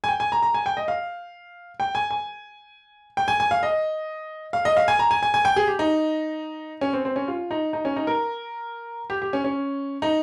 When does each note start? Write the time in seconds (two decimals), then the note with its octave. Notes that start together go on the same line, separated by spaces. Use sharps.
0.04 G#5
0.08 G5
0.20 G#5
0.32 A#5
0.43 A#5
0.54 G#5
0.66 G5
0.77 D#5
0.88 F5
1.80 G5
1.95 G#5
2.11 G#5
3.17 G5
3.28 G#5
3.40 G#5
3.51 F5
3.63 D#5
4.53 F5
4.65 D#5
4.77 F5
4.88 G#5
4.99 A#5
5.11 G#5
5.23 G#5
5.34 G#5
5.45 G5
5.56 G#4
5.67 G4
5.79 D#4
6.81 C#4
6.93 C4
7.05 C4
7.16 C#4
7.28 F4
7.51 D#4
7.73 D#4
7.85 C#4
7.96 D#4
8.07 A#4
9.10 G4
9.22 G4
9.33 C#4
9.44 C#4
10.02 D#4